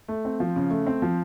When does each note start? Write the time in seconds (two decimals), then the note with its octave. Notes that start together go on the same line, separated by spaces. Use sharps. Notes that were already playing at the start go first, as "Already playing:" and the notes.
0.08 A3
0.25 C4
0.40 F3
0.56 C#3
0.71 A3
0.87 C4
1.02 F3